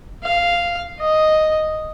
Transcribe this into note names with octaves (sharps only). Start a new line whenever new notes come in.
F5
D#5